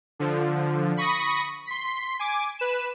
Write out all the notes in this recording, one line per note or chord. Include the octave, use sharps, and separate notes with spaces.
D3 F3
B5 C#6 D#6 A#6
C6 B6
G#5 D6
B4 E7